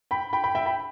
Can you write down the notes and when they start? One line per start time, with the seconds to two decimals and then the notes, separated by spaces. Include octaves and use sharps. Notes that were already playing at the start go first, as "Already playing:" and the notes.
0.11 G5 B5
0.33 G5 B5
0.44 G5 B5
0.55 E5 G5
0.66 G5 B5